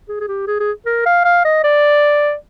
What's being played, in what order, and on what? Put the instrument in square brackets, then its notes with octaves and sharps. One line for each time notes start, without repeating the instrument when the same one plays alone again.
[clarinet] G#4
G#4
G4
G#4
G#4
A#4
F5
F5
D#5
D5